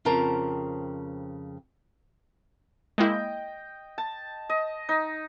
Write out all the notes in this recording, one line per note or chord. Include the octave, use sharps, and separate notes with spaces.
F2 C#3 C4 A#4 A5
G#3 A#3 E4 D#5 G5
A5
D#5
D#4